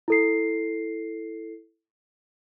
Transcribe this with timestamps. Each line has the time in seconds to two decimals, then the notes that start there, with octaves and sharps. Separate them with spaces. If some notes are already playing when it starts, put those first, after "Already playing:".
0.08 E4 A4 C7